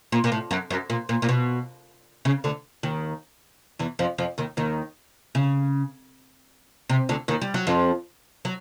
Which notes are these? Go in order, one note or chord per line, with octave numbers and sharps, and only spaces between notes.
A#2
A#2
A2
F#2
F#2
A#2
A#2
A#2
B2
C#3
D2 D3
D#2 D#3
E2 E3
F2 F3
F2 F3
D#2 D#3
D#2 D#3
C#3
C3
D2 D3
D#2 D#3
G3
F#3
F2 F3
F#3